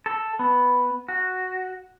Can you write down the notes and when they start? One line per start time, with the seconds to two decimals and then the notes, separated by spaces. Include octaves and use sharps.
0.06 A4
0.39 B3
1.08 F#4